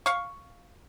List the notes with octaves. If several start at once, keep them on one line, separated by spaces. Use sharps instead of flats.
F5 C#6